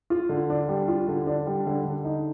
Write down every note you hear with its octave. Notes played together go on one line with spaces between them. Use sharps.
F4
D3
D4
G3
F4
D3
D4
G3
D3
D3
D#4